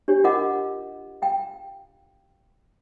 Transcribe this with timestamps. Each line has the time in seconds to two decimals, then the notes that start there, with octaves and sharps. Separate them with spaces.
0.08 D4 G4 C#5
0.24 F4 A#4 D#5 F#5 D6
1.22 F5 G5